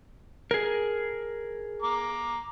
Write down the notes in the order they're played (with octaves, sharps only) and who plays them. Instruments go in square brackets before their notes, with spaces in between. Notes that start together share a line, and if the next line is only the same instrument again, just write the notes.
[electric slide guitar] G#4 A#4
[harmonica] A#5 D6